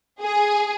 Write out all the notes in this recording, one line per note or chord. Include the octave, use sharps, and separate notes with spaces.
G#4